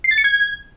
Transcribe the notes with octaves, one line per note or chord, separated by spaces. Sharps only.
C7
A6
C#7
G#6